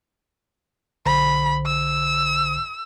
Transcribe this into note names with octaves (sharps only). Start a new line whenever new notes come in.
B1 D3 C5 B5
E6